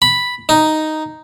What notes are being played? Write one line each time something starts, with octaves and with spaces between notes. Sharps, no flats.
B5
D#4